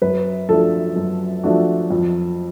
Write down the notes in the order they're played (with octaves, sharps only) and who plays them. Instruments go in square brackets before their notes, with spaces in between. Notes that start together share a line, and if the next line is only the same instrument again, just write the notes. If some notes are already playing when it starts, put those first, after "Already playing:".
[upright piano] F#2 [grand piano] B4
[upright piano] F3 A3 D4 F#4 [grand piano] A4
[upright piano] F#2
F3 A3 D4 F#4
F2